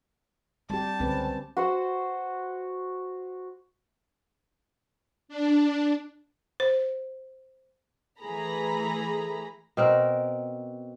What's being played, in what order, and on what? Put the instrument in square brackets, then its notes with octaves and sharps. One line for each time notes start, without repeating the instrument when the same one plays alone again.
[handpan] G3 G4 [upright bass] C4 [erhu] A5
[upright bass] C#2 D3 [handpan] C4 C#4 B4
[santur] F#4 C5 F#5
[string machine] D4
[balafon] C5
[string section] E3 A3 G#4 A#5 B5
[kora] B2 C4 A#4